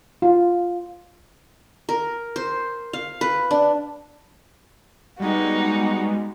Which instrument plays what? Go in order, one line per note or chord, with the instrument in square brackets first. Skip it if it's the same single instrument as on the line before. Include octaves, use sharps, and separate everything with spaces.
[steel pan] F4
[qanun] A#4
C5
F5
B4
D4
[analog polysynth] G3 G#3 B3 [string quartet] D#4 F#4